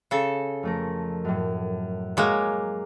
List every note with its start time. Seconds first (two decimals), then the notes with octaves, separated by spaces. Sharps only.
0.11 C#3 A4
0.63 F2 A3 A#4
1.25 F#2 A2
2.17 F#3 G#3 A#3 D6 G6 A#6